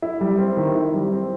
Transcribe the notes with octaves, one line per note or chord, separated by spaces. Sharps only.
E4
G3
C4
D#3
E4
G3
C4